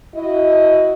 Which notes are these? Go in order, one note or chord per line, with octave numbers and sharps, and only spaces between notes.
E4 F#4 D#5